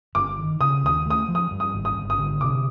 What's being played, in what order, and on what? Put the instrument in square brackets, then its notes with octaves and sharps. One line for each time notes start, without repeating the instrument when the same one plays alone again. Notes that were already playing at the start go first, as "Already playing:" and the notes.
[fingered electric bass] G1 [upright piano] D6
[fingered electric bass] D#3
[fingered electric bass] C#3 [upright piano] D#6
[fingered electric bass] D#2 [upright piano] D#6
[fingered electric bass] A3 [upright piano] D#6
[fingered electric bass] F3
[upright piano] D#6
[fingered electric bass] G2
[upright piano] D#6
[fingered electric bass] G#1
[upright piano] D#6
[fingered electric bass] G#1
[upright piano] D#6
[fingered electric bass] D3
[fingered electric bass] C3 [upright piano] D6